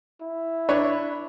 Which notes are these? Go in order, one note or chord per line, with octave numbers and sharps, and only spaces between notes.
E4
D4 B4 C#5